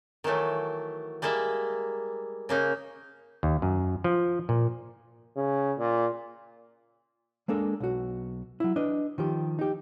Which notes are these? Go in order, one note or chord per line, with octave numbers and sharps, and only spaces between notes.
D#3 E3 F#3 A3
G3 G#3 A#3 E5
C#3 A#3 D#4
D#2
F#2
F3
A#2
C#3
A#2
G#3 A#3 D4 A4
B1 F#4
F#3 E4
D4 B4 D#5
D#3 F3 G4
D#4 G4